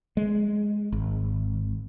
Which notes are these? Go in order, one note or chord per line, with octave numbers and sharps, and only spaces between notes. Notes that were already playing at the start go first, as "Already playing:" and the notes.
G#3
G#1